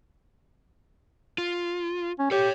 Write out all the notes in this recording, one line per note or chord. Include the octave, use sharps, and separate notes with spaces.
F4
C#4
G4 A4 C#5